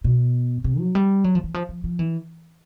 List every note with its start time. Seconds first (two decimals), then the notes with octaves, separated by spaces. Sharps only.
0.04 B2
0.64 C3
0.79 F#3
0.95 G3
1.24 F#3
1.35 F3
1.44 E3
1.54 F3
1.69 F3
1.84 F3
1.99 E3